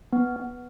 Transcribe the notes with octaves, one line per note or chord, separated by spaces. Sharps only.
B3
B3